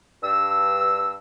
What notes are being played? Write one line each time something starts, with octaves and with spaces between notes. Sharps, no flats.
G2 E6